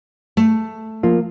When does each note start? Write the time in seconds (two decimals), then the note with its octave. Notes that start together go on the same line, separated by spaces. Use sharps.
0.37 A3
1.03 F3 A#3 F4